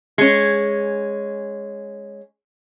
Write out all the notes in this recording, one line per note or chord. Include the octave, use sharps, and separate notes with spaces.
G#3 C#4